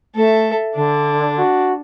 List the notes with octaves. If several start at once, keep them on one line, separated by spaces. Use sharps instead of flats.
A3 A4 E5
D3 D4
F#4